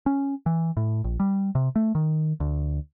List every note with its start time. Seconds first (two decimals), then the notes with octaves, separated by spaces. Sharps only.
0.06 C#4
0.46 E3
0.77 A2
1.04 A#1
1.20 G3
1.55 C3
1.76 A3
1.95 D#3
2.40 D2